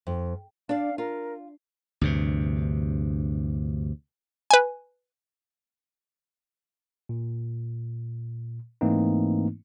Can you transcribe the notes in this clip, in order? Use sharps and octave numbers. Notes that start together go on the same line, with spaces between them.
F2
D4 D5 F5
F4 A#4
D2 G2 C3
B4 G#5
A#2
G#2 E3 A3 A#3 C4 D#4